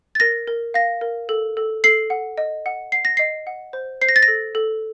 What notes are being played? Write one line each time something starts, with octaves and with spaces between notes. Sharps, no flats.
A6
A#4 A#6
A#4
F5 A#6
A#4
A4
A4
A4 C7
F#5
D#5
F#5
F#5 C7
A#6
D#5 C7
F#5
C5
C5 C7
A#6
A6
A#6
A4
A4